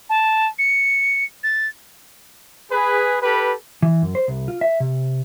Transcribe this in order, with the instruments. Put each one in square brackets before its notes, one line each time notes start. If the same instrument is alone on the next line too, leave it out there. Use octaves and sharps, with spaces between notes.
[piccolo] A5
C#7
A6
[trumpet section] G#4 B4
G4 A4 B4
[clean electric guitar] E3
F#2
C5
C2
F4
E5
C3